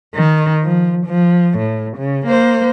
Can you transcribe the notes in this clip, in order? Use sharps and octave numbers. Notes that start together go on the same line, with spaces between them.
D#3
F3
F3
A2
C#3
A#3 C5